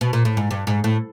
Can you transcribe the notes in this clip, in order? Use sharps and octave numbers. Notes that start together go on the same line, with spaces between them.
B2
A#2
A2
G#2
G2
G#2
A2